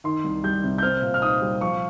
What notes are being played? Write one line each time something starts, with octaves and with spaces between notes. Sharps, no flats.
D#3 C6
C2
G3 G6
C3
G6
C4 F6
A#2
F6
D#4 D#6
G3
F3 C#6